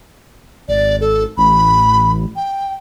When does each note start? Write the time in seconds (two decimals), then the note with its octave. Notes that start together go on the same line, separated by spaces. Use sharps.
0.68 G#1 D5
1.01 A4
1.38 A1 B5
2.36 G5